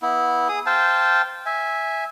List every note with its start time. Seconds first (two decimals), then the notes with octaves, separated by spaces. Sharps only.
0.02 B3 E4
0.49 G#4 D#6
0.66 C5 F5 G5 A5
1.46 E5 G#5